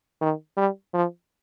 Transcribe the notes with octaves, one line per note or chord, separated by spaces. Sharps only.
D#3
G3
F3